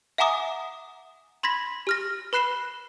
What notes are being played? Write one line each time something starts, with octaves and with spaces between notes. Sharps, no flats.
E5 F#5 G#5 A#5 D6 D#6
B5 C6 G#6 A#6 B6
G4 F6 A#6
B4 B5 F#6 C7 E7 G7